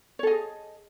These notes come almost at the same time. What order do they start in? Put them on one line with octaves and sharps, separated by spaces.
C#5 A4 D#5 G#4